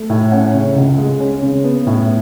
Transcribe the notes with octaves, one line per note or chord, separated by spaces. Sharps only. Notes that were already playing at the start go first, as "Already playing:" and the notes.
Already playing: A3
A2
C#4 F#5
C#3
C#2
G#3
C#4
C#3
B3
A2